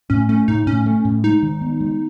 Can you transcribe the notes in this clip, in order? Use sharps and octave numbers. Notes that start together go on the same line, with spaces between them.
A2 C#4
A3 C#4
A2 D#4
A2 C#4
A3
A2
G#3 D#4
D#3
B3
G#3